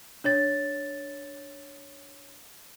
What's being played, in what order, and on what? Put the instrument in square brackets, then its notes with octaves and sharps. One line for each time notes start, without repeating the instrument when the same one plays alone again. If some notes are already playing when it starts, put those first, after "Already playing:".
[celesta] D4 C#5 A6